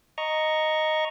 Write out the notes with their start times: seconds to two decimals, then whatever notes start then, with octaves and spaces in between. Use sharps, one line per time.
0.18 D#5 A#5 C#6